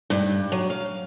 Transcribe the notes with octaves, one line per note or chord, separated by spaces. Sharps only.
G2
F#3
F5